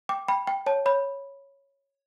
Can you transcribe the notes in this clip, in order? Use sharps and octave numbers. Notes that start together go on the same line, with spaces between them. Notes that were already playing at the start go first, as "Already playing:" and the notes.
G5 D6
G5 B5
G5
C#5 A5
C#5 B5